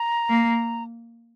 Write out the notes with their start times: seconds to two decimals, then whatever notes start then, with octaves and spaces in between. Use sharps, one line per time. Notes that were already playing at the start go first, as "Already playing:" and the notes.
Already playing: A#5
0.30 A#3